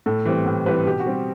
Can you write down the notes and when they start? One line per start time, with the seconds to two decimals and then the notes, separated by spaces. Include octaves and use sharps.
0.06 A2 A4
0.25 E3 G3 C4
0.46 A2
0.66 E3 G3 C4 B4
0.85 B2 G4
1.00 F#4
1.06 G3 C4